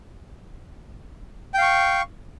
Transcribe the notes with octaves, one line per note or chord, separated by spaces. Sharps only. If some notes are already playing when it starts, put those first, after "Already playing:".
F5 G5 C#6